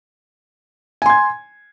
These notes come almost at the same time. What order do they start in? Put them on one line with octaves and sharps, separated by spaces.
G#5 C6 G#6